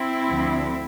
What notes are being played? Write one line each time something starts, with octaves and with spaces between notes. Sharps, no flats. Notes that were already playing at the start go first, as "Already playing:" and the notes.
Already playing: C4 E4
D2 D3 F3